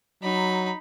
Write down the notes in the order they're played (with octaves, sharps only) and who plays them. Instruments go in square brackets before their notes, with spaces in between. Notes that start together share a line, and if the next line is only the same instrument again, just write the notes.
[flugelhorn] F#3 [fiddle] D#4 B5